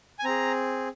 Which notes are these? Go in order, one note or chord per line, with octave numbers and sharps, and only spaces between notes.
G#5
C4 G#4 A#5